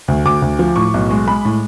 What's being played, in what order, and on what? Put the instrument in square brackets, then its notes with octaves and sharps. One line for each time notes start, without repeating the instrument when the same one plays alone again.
[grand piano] D2
D2 D6
D2
F3
A2 C#6
B1
G#3
G#3 B5
A2